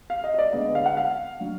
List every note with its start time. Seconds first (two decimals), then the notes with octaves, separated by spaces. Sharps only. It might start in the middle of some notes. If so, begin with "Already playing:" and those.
0.10 F5
0.24 D#5
0.34 D#5
0.38 D5
0.53 D3 G#3 B3 D#5
0.75 F5
0.86 F#5
0.97 F5
1.40 F#3 D4